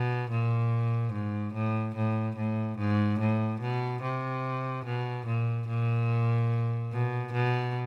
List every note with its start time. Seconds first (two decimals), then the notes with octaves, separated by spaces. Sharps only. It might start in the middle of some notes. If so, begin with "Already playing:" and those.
Already playing: B2
0.31 A#2
1.13 G#2
1.54 A2
1.96 A2
2.37 A2
2.79 G#2
3.20 A2
3.61 B2
4.02 C3
4.86 B2
5.26 A#2
5.68 A#2
6.92 B2
7.33 B2